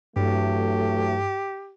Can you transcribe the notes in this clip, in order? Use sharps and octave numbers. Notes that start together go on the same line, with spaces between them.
G2 E3 F#3 A3 G4